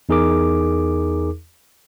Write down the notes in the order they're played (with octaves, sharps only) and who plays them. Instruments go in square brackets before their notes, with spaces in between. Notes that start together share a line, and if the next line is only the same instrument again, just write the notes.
[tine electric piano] E2 D#4 G#4 A#4 D6